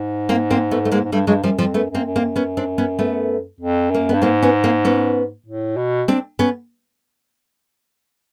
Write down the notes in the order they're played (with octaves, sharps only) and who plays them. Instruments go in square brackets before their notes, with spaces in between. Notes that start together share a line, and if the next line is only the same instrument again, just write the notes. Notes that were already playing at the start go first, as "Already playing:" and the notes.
Already playing: [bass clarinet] G#2
[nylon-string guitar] A#3 C4
A#3 C4
A3 B3
A3
G#3 A#3
[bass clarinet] G#2
[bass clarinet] G2 [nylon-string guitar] G3 A3
[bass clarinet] G2 [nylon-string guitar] F#3 G#3
[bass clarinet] F#2 [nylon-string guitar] F3 G3
[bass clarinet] F2 [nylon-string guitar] F3 G3
[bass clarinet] F#2 [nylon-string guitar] A3 B3
[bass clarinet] F#2 [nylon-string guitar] A#3 C4
[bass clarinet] F#2
[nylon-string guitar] A#3 C4
[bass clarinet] F#2
[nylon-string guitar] B3 C#4
C4 D4
B3 C#4
A3 B3
[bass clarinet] F2
[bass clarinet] F#2 [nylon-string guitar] A#3
[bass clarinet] G2 [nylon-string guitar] B3
[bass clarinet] G#2 [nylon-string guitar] A#3 C4
[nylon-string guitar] B3 C#4
A#3 C4
B3 C#4
[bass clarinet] A2
B2
[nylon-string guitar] C4 D4
B3 C#4